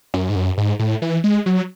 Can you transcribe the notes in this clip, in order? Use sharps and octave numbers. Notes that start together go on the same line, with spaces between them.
F#2
G#2
F#2
G#2
A2
E3
G#3
F#3